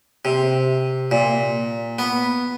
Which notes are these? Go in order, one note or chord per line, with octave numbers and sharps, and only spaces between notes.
C3
A#2
B3